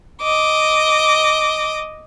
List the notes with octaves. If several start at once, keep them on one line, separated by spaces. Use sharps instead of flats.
D#5 D6